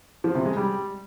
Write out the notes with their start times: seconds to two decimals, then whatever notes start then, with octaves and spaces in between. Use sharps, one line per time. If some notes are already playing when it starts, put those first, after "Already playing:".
0.24 F3
0.35 C3
0.46 G#3
0.57 G3